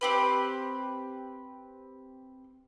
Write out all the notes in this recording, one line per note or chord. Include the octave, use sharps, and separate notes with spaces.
C4 G4 B4